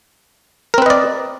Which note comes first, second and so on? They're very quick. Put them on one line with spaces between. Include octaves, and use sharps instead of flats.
A#4 C4 B4 D#5 D5